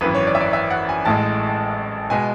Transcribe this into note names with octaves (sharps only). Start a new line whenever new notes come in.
G#1 F#2 E3 B4
C#5
D5
E5
D5
E5
F#5
G#5
A1 A2 G#3 A5
B2 G#3 G#5